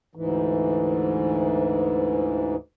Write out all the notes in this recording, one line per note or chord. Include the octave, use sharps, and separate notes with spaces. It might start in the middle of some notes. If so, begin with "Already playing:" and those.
D2 G#2 E3